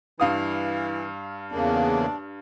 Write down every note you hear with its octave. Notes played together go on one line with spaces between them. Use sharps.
G2 E3 F5 D#6
E2 C#3 A#3 D4